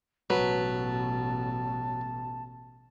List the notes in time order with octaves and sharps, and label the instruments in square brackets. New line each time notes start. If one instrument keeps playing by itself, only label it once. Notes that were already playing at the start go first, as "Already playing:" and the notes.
[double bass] A1 B2 [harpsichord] F#3 [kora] B4 [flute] A5